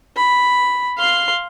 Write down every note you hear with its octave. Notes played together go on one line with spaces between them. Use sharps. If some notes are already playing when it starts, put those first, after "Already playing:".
B5
F5 C6